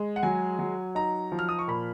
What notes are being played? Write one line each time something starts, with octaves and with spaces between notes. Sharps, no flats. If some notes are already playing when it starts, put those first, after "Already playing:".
Already playing: G#3
F#5
F#3 G#5
F#3
D#4 A#5
F3
F6
D#6
C#6
A#2 B5